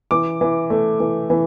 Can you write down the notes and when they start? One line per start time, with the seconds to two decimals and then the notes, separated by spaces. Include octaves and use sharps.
0.11 E3 D6
0.41 E3
0.70 A3
1.00 E3
1.30 E3